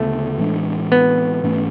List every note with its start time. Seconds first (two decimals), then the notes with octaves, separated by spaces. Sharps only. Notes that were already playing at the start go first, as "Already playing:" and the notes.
Already playing: D2 C#3 A3 B3
0.38 A2 E3 G#3 D4
0.92 B3
1.43 G#2 E3 A3 C#4